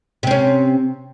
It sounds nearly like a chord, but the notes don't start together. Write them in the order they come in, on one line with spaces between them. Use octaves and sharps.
C3 C4 C#4